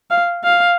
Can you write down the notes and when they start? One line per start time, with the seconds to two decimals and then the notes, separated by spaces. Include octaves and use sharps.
0.10 F5
0.44 F5